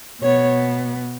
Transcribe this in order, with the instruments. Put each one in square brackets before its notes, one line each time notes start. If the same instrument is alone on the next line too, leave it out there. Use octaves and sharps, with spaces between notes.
[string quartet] B2 B3 C#5